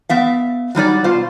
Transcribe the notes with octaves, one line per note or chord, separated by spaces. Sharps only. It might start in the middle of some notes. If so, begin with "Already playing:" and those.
B3 E5 F5
F#3 G3 D#4 D5
B2 F4 C5 F5